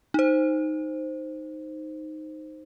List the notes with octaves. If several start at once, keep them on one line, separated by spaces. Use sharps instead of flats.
D#4 C5